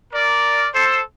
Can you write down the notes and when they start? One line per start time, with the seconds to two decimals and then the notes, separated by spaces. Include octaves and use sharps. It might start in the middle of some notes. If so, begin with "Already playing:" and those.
0.12 A#4 D5
0.73 A4 C5